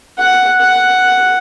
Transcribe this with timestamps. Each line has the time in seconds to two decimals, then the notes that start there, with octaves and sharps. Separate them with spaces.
0.18 F#5
0.61 F#5